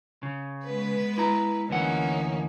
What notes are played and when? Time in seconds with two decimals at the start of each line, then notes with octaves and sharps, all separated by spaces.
0.23 C#3
0.65 G#3 B3 B4
1.18 E4 A#5
1.69 D2 E3 A#3 C#4 D#4 F#5